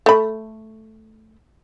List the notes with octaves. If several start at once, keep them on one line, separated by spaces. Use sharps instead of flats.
A3 B5